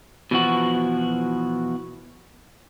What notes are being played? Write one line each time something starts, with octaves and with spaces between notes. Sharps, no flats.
B2 E3 F3 F#4